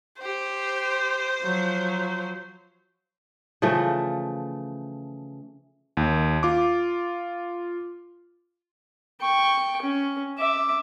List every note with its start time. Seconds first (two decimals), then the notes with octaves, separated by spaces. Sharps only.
0.22 G4 C5
1.42 F3 F#3
3.62 C#3 E3 F3 A3
5.97 D#2
6.43 F4 D6
9.21 G5 C#6
9.82 C#4
10.38 E5 D6